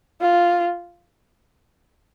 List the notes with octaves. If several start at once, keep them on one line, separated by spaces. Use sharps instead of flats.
F4